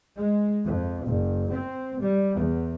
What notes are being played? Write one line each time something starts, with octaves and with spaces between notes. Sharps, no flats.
G#3
F2
F#1
C4
G3
E2